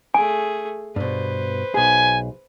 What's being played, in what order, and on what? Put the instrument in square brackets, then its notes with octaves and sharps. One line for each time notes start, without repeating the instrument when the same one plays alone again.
[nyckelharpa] A3 G#4 [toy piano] G#5
[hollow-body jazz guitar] G2 B2 [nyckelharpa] B4 C5
[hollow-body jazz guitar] B1 G#4 [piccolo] G#5